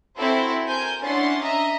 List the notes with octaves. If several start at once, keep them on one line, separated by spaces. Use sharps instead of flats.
C4 E4 F#4 A4 C5
A#4 C5 G#5 G6
C#4 D4 E4 F#5 C6 A6
D#5 E5 A#5